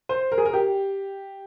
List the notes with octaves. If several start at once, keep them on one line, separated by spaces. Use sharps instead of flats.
C5
A#4
G#4
A#4
G4